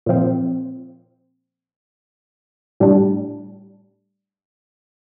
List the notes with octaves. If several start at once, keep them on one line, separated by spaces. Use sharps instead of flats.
A#2 F3 C4
A2 G3 D4